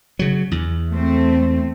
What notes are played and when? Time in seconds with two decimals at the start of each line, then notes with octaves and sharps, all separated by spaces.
0.19 C#3 F#3
0.51 E2
0.90 A3 C4